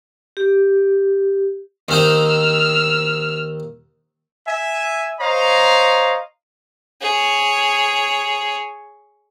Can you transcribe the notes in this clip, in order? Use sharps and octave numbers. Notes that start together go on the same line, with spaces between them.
G4
D#2 C4 D#4 E6 F6
E5 G#5
C5 C#5 D#5 F5 A#5
G#4 C#5